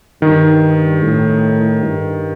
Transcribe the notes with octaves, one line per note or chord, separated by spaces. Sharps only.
G2 D#3
A2
G2